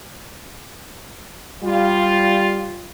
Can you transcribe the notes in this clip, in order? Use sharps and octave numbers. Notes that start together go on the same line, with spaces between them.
G3 F4